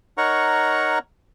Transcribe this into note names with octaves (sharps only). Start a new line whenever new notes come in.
D#4 A#4 C#5 F#5 A#5 C#6